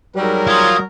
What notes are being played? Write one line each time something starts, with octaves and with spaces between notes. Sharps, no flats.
G#2 F#3 G3 A#4
F3 C6 D#6 G#6